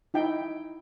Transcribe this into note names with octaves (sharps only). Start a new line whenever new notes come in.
D#4 E4 G5